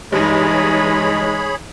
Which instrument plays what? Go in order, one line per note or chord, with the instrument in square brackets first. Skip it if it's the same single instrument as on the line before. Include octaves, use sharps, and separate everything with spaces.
[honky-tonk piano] G2 [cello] E3 D#4 [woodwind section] G#3 [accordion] G#4 C#5 B5